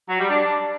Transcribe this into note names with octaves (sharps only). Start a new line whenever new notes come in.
F#3
G3
D4